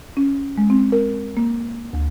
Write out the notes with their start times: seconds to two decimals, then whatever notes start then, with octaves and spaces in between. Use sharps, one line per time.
0.17 C#4
0.58 G#3
0.70 C4
0.92 A#4
1.37 A#3
1.93 D2